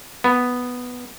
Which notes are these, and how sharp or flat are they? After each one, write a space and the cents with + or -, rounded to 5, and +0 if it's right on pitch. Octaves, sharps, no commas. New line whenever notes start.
B3 +0